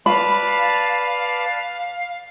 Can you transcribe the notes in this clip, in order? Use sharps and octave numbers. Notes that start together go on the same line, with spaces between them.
B4 D5 F5 A5 B5